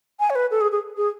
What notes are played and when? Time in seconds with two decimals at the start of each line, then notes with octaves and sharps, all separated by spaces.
0.20 G#5
0.30 C#5
0.35 B4
0.51 A4
0.61 G#4
0.72 G#4
0.97 G#4